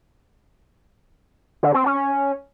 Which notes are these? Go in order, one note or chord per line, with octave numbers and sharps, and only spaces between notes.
D3
C4
C#4